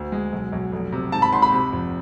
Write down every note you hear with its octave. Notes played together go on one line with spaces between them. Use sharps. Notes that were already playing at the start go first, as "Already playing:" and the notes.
Already playing: D2
G#3
B1
B1
F1
C3
G#2 A5
B5
G#1 C6
B5
C3
F2